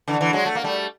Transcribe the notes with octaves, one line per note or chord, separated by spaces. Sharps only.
D3 E3
D3 E3
F#3 G#3
A3
A#3
G3 A3